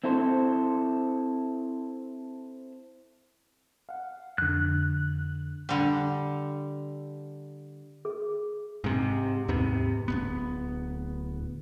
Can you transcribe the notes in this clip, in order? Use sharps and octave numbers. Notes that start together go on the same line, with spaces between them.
C4 E4 A4 C5
F5 F#5
F2 D3 F#6
D3 G3
G#4
G#2 C3
D#2 G#2 C3 B3
D1 C#2 B3